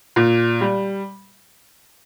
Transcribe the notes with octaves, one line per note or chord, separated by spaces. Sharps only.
A#2
G3